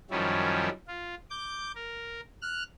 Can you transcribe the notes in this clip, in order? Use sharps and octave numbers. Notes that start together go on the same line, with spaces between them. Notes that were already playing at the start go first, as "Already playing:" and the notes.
F#2 D#3 F3 G3 C#4 E4
F4
D6 G6
A#4
F6 F#6